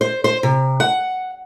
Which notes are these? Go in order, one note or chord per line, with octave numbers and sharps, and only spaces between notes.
C5
C5
C3
F#5